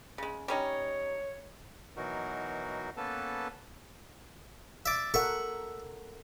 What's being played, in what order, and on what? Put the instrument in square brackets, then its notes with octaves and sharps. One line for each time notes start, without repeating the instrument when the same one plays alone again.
[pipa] C#3 G#3
[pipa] G3 C#4 D#4 [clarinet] C#5
[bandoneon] B2 E3 F#3 D#4 F#4 A#4
A#3 B3 C#4 A4 B4 A5
[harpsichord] D5 E5
[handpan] A4 A#4 F#5 [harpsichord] E5 C#6